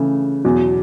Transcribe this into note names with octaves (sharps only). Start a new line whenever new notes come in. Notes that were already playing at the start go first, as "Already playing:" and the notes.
Already playing: C#3 E3 A3
E2 B2 F#3